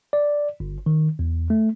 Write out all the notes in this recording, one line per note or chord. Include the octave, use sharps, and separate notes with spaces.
D5
G1
D#3
E2
A3